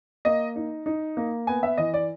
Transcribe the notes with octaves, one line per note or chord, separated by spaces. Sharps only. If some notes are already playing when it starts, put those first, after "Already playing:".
A#3 D#5
D#4
D#4
A#3
B3 G#5
E5
E3 D#5
D5